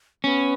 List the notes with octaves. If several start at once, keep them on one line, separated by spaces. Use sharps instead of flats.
B3 C#4